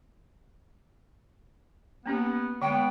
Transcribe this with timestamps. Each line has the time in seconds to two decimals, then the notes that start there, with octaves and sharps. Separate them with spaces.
2.06 A#3 B3 C#4 G4
2.62 D3 G#3 B3 G5